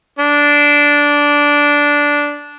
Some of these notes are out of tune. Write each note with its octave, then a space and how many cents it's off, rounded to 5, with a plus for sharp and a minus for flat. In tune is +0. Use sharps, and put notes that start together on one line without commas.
D4 -10